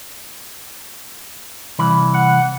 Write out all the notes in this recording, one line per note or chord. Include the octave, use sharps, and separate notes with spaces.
C2 E3 B5
F#5